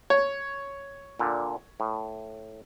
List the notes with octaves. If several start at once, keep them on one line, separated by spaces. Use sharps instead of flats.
C#5
A#2 D3
A2